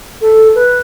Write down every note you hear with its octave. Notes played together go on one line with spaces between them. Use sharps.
A4
B4